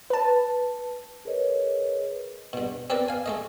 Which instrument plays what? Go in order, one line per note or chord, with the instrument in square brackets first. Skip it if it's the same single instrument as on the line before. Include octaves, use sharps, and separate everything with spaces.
[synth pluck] B4 A5
[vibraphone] G#4 A#4 B4 C#5 D#5
[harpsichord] G2 B2
C4 G4 A#4 B4 D5
F5 G#5
G#3 A3 D#5